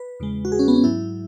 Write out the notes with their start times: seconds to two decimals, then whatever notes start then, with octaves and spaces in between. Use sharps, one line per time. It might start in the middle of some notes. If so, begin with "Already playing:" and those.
Already playing: B4
0.20 E2 C#3 G#3
0.45 F#4
0.52 G#4
0.59 C#4
0.68 B3
0.76 C#4
0.84 G#2 F#3 E4